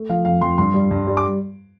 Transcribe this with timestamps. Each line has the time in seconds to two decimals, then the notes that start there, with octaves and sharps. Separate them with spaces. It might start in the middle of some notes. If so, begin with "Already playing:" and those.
Already playing: A3
0.09 F3 F5
0.25 F2 F5
0.41 F2 C6
0.58 G2 C6
0.74 G3
0.91 G2
1.07 G3
1.17 D6